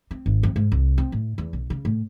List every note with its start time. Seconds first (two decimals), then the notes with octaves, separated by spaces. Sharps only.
0.11 C4
0.26 G#1
0.43 F2
0.56 G#2
0.72 C2
0.98 C4
1.12 A2
1.38 E2
1.53 B1
1.70 C#3
1.85 A2